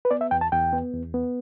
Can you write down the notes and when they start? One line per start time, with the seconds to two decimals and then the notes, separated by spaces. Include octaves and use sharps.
0.05 B4
0.11 B3 D5
0.21 E5
0.31 E2 G5
0.41 A5
0.52 E2 G5
0.73 B3
0.93 E2
1.14 B3